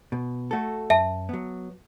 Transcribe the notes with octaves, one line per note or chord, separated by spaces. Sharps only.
B2
A3 F#4 A4
F#2 E5 A5
F#3 B3